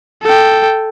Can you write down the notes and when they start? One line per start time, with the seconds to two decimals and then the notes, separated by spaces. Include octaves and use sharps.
0.22 A4 G5